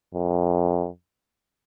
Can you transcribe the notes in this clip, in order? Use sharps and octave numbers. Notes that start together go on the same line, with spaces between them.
F2